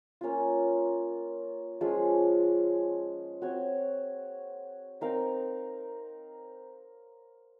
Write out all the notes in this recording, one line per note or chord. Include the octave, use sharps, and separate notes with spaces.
A#3 C#4 F4
F3 G#3 C#4 G#4
C4 F#4 C#5
C4 D#4 A#4 F5